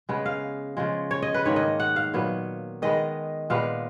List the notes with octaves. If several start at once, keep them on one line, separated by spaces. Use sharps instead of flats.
C#3 G#3 B3
F5
C#3 F3 G#3
C#5
D#5
B4
G#2 D#3 A#3 C#5
D#5
F#5
F5
A#2 F#3 B3
D#3 G#3 B3 D#5
A#2 G#3 B3 F5